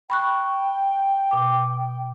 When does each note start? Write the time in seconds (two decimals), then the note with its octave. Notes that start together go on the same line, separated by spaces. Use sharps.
0.10 G5 B5 C#6 F#6
1.31 B2 D6